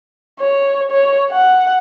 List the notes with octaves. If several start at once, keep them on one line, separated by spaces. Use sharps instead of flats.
C#5
C#5
F#5